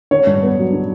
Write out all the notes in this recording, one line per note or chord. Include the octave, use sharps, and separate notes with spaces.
D3 C#5
G2
B3
F#3
D3